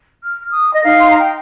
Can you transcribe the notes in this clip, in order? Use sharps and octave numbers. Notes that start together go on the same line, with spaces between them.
F6
D#6
D#5
D#4 A#4 F5
C6
A#5
G5